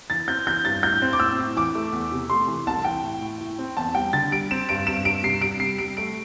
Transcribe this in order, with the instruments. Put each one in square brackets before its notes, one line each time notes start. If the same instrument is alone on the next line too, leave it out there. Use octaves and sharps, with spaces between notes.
[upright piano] E3 A6
C4 G6
E3 G6
G2 A6
A2 G6
C4
D6
A2 E6
A2
E3 D6
A3
E2
C3
A3 C6
E3
C2 A5
E3 G5
A2
A2
A2
C4
E2 A5
G3 G5
D3 A6
G3 D7
C4 E7
G2 D7
G2 E7
G2 D7
C3 C7
G3 D7
G3 C7
G3 D7
A3 D7